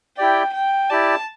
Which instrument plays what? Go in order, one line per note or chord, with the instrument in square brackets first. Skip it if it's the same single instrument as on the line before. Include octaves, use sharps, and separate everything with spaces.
[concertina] E4 G4 D5 [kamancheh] G5
[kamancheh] G5
[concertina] E4 G4 D5 [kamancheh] A5